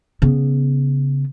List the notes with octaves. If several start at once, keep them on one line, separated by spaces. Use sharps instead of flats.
C#3 B3